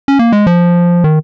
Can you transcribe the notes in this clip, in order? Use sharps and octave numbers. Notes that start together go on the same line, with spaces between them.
C#4
A#3
G#3
F3
D#3